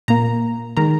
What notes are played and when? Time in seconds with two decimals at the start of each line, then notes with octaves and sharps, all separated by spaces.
0.08 A#2 A#3 A#5
0.77 D#3 G#3 A#5